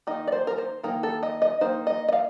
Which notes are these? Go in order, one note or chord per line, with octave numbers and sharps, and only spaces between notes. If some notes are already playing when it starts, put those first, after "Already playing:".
D#3 A#3 D#4 D#5
D5
C5
A#4
C5
D#3 A#3 D#4 A#4
A4
D#5
D#5
D#3 A#3 D#4 C5
D#5
D#5
F5